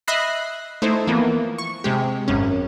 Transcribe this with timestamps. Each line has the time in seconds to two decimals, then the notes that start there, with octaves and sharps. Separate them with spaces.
0.08 D#5 E5 B5 F#6 A#6 C7
0.82 A3 D#4 E4 C5
1.07 E3 F3 A#3 B3
1.58 C#6
1.84 C3 G#3 G4
2.28 G#1 F#2 C#4